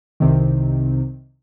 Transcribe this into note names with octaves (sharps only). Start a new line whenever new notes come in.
C2 C3 D#3